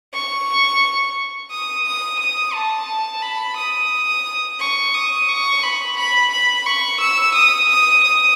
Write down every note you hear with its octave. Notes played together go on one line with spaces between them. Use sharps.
C#6
D#6
D#6
D#6
A5
B5
D#6
C#6
D#6
C#6
B5
B5
B5
C#6
E6
D#6
D#6
D#6